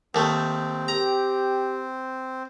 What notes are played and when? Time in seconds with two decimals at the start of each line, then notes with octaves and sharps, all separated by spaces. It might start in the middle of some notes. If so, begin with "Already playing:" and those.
0.15 D#2 A3 C4
0.88 G4 A#5